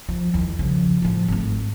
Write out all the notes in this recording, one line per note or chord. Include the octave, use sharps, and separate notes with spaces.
F3
E2 D#3
C#3 F3
A2 F3
G#1 A3